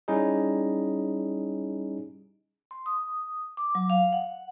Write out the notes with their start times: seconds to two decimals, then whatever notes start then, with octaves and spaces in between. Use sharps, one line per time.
0.08 G3 C#4 D#4 E4 G#4
2.71 C6
2.86 D#6
3.57 D6
3.75 F#3
3.90 F5
4.13 F#5